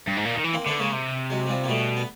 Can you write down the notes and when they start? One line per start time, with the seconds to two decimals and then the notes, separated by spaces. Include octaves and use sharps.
0.07 G2
0.17 G#2
0.25 A#2
0.36 D#3
0.44 E3
0.54 A#3 C4
0.66 D3 A3 B3
0.80 C#3 G#3 A#3
0.92 C3
1.30 F#3 G#3
1.46 G#3
1.49 F3 G3
1.64 A#3
1.68 B2 G3 A3
1.97 B3